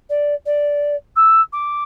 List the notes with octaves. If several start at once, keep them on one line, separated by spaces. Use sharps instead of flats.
D5
D5
E6
D6